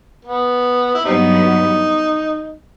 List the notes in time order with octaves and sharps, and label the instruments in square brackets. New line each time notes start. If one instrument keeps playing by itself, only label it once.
[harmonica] B3
E4
[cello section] G2 F#3 B3 [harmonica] G3 C4 D#4